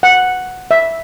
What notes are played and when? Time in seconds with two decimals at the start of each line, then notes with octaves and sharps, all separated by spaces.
0.03 F#5
0.71 E5